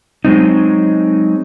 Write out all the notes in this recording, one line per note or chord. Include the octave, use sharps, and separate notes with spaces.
F#3 G#3 C4 D#4